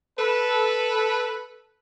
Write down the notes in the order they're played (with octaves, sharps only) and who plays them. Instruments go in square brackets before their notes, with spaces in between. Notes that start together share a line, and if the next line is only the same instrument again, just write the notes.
[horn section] A4 B4